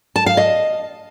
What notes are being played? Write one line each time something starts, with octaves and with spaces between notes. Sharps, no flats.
A5
F5
D#5